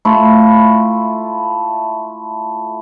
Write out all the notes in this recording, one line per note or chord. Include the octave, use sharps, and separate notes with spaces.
A3 E4 F4